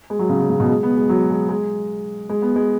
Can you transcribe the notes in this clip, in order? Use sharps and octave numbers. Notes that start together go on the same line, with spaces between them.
G#3
F#3
C#3
C#3
C#3
B2
G#3
B3
G#3
F#3
G#3
G#3
G#3
B3
G#3